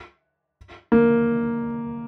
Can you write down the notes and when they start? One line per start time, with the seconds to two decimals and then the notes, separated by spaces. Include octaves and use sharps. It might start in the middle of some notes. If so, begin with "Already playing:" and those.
0.92 A#3